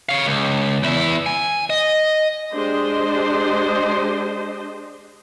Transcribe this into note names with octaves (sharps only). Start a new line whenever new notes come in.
C#5 F5
C#2
E2 E4
G#5
D#5
G#3 D4 G4 C5 D#5